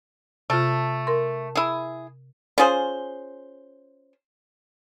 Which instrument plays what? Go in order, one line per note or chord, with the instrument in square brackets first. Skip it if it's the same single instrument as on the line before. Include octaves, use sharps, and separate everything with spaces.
[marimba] C3 F4 [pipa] A3
[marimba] A#4 C6
[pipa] E4 G#4
C#4 F4 G#4 C5